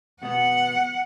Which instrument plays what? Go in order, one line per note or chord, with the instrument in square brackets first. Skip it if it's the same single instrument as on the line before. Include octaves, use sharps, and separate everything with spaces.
[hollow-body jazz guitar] B2 B3 [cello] F#5